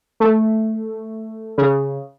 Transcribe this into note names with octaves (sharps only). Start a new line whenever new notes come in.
A3
C#3